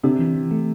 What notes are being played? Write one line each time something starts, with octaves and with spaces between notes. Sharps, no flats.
C3 D4
E3
E3
A3